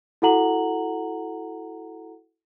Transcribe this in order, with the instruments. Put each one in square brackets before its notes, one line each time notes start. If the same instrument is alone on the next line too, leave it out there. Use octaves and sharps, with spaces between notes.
[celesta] E4 F#4 A4 F#5 A#5 F#7